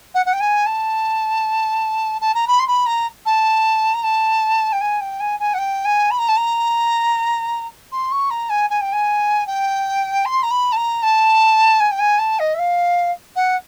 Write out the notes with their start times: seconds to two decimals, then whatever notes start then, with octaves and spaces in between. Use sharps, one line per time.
0.14 F#5
0.26 F#5
0.33 G5
0.40 G#5
0.66 A5
2.21 A5
2.34 A#5
2.47 B5
2.59 C6
2.67 B5
2.86 A#5
3.25 A5
3.94 A#5
4.03 A5
4.72 G5
4.81 G#5
5.00 G5
5.20 G#5
5.39 G#5
5.54 F#5
5.58 G5
5.85 G#5
6.11 B5
6.18 A#5
6.28 A5
6.37 A#5
7.92 C6
8.11 C#6
8.30 A#5
8.49 G#5
8.70 G#5
8.81 G5
8.92 G#5
9.46 G5
10.25 C6
10.43 A#5
10.51 B5
10.72 A5
10.76 A#5
11.02 A5
11.80 G#5
11.91 G5
11.99 G#5
12.18 A5
12.39 D#5
12.54 E5
12.59 F5
13.36 F#5